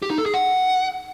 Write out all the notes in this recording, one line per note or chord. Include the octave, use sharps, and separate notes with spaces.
G4
D#4
A4
G#4
F#5